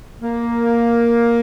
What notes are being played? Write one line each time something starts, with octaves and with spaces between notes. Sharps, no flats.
A#3